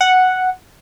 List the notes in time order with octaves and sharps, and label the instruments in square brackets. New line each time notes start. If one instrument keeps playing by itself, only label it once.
[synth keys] F#5